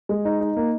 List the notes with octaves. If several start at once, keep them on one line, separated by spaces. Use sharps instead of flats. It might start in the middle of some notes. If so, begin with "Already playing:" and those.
G#3
D#4
D#4
A#3